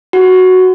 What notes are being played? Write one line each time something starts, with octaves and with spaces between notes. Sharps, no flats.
F#4